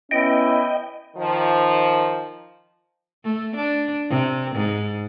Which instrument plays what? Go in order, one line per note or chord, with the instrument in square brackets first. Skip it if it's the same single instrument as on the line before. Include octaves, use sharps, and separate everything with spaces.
[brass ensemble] B3 C#4 E4 [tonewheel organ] D#5 G5
[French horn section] D#3 F3
[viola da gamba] A3
D4
C3
G#2